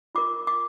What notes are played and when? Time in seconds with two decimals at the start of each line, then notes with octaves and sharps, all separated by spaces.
0.15 F4 A#4 D6
0.47 D6